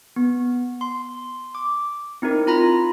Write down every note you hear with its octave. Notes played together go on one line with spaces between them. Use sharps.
B3
C6
D6
C4 D#4 E4 A#4
F4 A#5 B5 A#6